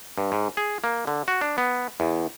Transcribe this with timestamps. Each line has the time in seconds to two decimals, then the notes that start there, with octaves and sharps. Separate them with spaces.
0.18 G2
0.32 G#2
0.57 G#4
0.84 A#3
1.07 D3
1.28 F#4
1.41 D4
1.58 B3
2.00 E2